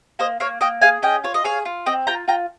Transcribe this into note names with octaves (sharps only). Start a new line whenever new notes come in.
A#3 C5 D#5
A#3 C#5 F5
A#3 D#5 G5
G#4 F5 G#5
C#4 D#5 G5
F4 C#5
D#5
G#4 C#5 F5
F4
C4 D#5 G5
F4 G5 A#5
F4 G5 A#5